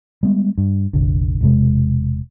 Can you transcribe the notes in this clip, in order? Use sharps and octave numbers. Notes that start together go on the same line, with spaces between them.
G3 G#3 B3
G2
F1 A#1 D3
E1 C3 G#3